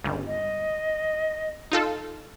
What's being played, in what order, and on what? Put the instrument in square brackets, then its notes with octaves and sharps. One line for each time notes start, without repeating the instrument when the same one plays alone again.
[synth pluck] G1 C#2
[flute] D#5
[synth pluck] D#4 F4 A4